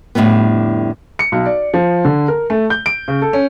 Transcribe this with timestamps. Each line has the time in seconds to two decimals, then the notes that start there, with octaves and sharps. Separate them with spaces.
0.15 F2 A2 D3 G3 B3
1.19 C#7
1.32 B1
1.46 D5
1.74 F3
2.05 D3
2.28 A#4
2.50 A3
2.70 G6
2.86 D7
3.08 C#3
3.22 A4
3.33 C#4